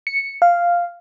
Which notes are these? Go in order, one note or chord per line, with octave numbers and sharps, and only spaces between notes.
C#7
F5